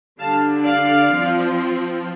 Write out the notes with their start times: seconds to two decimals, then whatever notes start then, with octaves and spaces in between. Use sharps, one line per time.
0.19 D3 G3 D4 F5 A5
0.65 D5 F5
1.12 F3 C4 F4